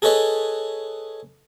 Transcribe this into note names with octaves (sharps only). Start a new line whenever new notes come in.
G#4 A4 B4 C#5 D#5